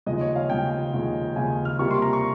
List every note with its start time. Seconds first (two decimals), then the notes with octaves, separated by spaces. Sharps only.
0.06 D#2 C#3 F3 G#3 D#5
0.21 C#5
0.36 F5
0.50 D#2 C#3 F3 G#3 G5
0.93 D#2 C#3 F3 G#3
1.36 D#2 C#3 F3 G#3 G#5
1.65 F6
1.79 C3 G3 A#3 F4 C#6
1.91 C6
2.02 A#5
2.13 C#6